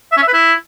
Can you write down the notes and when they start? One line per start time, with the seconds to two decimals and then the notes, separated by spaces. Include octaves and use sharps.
0.12 E5
0.17 C#4
0.23 E5
0.28 B4
0.33 E4